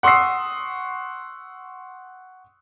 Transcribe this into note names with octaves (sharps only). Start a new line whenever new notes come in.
F#5 C6 C#6 D#6 E6 C7